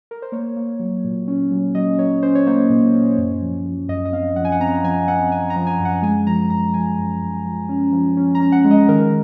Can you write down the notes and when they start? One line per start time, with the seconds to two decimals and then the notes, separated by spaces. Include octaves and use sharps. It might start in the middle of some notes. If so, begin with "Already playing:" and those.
0.11 A#4
0.22 C5
0.32 A#3 C#5
0.56 A#3
0.80 F#3
1.04 A#2
1.28 C#4
1.51 F#3
1.75 F#3 D#5
1.98 F#3 C#5
2.23 C#4 C5
2.35 C#5
2.47 A#3 C5
2.70 A#2
2.95 C#4
3.18 F#2
3.41 F3
3.66 F3
3.89 F#2 D#5
4.06 D#5
4.13 C4 F5
4.36 F3 F#5
4.45 G#5
4.52 F#5
4.60 C4 A#5
4.84 F3 G#5
5.08 C4 F#5
5.32 C4 G#5
5.50 A#5
5.56 F3
5.67 G#5
5.80 F#2
5.85 F#5
6.03 G#3 G#5
6.27 F3 A#5
6.50 F#2 A#5
6.74 F3 G#5
6.99 F#2
7.22 F#2
7.45 F3
7.69 C#4
7.93 F3
8.17 C#4
8.35 A#5
8.40 C#4
8.52 F#5
8.65 G#3
8.71 D#5
8.88 D#3 A#4